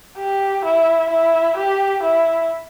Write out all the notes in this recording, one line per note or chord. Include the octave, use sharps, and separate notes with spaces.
G4
E4
E4
G4
E4